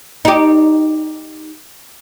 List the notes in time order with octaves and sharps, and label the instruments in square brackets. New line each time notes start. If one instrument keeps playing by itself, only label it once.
[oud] D#4 G4